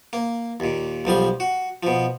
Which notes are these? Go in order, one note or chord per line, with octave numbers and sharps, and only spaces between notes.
A#3
D#2 A#2
B1 F3 G3 C6
F#4
B2 F3